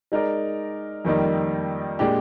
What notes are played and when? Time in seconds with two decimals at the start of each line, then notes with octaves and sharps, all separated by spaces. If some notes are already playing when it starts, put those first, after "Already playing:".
0.12 G#3 D#4 A#4 D5
1.05 F2 D#3 G3 A#3 D#4
1.99 A#2 G#3 D4 G4